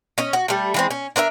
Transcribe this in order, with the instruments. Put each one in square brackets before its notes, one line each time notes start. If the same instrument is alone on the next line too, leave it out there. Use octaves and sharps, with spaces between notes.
[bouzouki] C#4 D#5
F#4
G3 A3
E3 G#3 C4
C#4
D4 A#4 C#5 E5